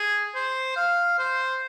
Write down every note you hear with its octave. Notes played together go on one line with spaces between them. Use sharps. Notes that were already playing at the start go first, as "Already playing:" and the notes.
Already playing: G#4
C5
F5
C5